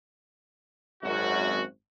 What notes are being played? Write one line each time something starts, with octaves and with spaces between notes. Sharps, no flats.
G#1 F#2 F#4